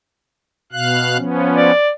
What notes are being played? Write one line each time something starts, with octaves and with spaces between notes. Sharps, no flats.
B2 F5 F#6
F3 B3 C#4
D5